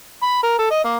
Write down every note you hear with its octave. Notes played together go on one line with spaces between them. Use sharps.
B5
A#4
A4
D#5
A#3